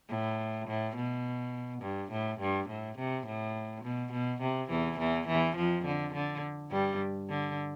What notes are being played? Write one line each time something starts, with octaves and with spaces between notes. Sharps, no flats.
A2
A2
B2
G2
A2
G2
A2
C3
A2
B2
B2
C3
E2 E3
E2 E3
E2 E3
F2 F3
D3
D3
G2 G3
D3